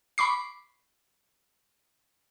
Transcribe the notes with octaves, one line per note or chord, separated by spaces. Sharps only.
B5 C#6 D6 C7